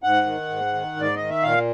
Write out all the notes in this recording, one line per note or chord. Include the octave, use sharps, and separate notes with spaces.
G#2 F#5
D#3
G#2
D#3
G#2 D5
D#3 D#5
E5
A#2 F5